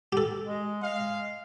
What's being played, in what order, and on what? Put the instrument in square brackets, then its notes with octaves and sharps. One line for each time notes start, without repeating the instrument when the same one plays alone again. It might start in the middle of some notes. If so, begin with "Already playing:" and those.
[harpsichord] G4 A4
[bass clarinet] G#3
[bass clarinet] G#3 [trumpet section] F5